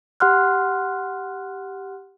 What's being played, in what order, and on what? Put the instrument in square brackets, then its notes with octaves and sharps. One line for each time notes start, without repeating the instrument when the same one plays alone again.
[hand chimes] G4 F#5 C6 F6 F#6